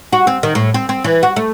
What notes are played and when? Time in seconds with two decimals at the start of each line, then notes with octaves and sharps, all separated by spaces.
0.13 F#4
0.27 C4
0.43 D#3
0.55 A2
0.74 C4
0.89 C4
1.04 E3
1.23 F#4
1.36 A3